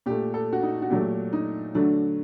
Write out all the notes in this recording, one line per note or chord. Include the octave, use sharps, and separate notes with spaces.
A#2 A3 G4
A4
F#4
D#4
F#4
A#2 F#3 A3 G4
D#4
D3 F#3 A3 D4